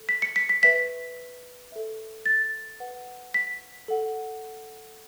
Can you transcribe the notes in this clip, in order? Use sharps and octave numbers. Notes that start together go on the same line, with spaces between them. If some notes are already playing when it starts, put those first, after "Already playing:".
Already playing: A4
B6
C#7
B6
B6
B4 E5 B6
A4 E5
A6
B4 F#5
B6
A4 F#5